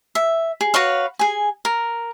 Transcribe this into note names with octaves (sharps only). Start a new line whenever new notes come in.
E5
G#4
F#4 B4 C#5 F5
G#4 G#5
A#4